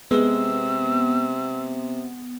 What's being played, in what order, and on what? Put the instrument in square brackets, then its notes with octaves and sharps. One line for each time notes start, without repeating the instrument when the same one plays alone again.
[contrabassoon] C3 [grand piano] G#3 [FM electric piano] B3 [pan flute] E6